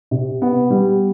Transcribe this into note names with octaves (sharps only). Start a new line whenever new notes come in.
C3
B3
G3